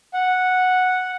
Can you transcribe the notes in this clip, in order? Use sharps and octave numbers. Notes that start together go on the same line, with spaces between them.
F#5